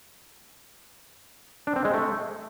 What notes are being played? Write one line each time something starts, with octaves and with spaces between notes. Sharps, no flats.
D4
C4
G#3
A3